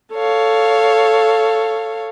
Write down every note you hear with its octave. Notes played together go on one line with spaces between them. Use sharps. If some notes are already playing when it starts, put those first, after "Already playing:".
A4 C#5 F5